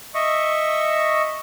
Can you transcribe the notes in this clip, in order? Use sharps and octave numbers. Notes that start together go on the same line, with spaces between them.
D#5 E5 C#6